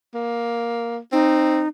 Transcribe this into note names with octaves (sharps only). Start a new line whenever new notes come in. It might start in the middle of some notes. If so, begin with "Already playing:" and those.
A#3
C4 D#4